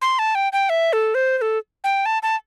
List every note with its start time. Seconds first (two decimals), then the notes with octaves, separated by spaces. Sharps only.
0.01 C6
0.19 A5
0.35 G5
0.53 G5
0.69 E5
0.93 A4
1.15 C5
1.38 C5
1.41 A4
1.84 G5
2.06 A5
2.23 A5